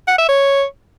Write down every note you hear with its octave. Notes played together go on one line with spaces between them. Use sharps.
F#5
E5
C#5